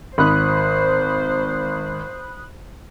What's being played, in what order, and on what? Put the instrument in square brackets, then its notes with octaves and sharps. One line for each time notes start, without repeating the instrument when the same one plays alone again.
[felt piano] G#1 [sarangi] C5 [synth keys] B5 D#6 F#6